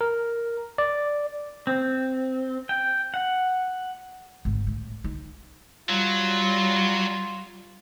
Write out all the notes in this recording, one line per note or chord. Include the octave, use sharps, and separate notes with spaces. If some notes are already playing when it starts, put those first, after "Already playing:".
A#4
D5
C4
G5
F#5
G#1
A2
D#4
F#3 G3 F4